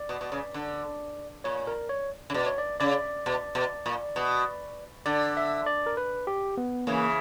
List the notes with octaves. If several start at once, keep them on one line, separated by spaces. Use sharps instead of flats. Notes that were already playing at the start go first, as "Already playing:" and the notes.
Already playing: D5
B2
B2
C#3
D3
A#2 C#5
A#4
C#5
C#3
B2 D5
C#5
D5
C#3 D5
B2
B2
A#2
B2
D3 D5
E5
D5
A#4
B4
G4
B3
C#3 E3 A#3